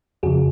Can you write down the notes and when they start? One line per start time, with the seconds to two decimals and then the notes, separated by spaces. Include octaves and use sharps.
0.23 F2 C#3 F3 F#4 G#4